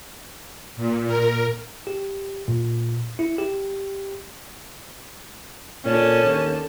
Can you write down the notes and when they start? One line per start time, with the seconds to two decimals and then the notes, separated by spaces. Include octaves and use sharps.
0.76 A#2
1.06 A#4
1.87 G4
2.48 A#2
3.19 E4
3.38 G4
5.85 A#2 D3 C#4 A5
6.24 D#2